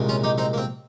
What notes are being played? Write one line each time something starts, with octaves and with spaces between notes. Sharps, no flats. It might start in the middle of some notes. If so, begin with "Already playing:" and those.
Already playing: C2 A#2 G#3
C#4 F4
D#4 G4
C4 D#4
A#3
C4